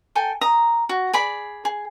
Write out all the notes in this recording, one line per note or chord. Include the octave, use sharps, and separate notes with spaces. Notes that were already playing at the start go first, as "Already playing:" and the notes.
A4 G5 G#5
A#5 D#6
F#4
G#4 D5 B5
G#4